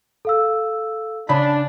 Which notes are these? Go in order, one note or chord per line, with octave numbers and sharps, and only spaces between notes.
A4 F5 E6
C#3 D4 B5